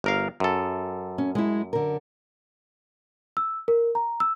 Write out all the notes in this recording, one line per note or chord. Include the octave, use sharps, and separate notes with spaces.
G1 A#4 F5
F#2 A4
C#4
G#3 E4
D3 A#4
E6
A#4
A#5
E6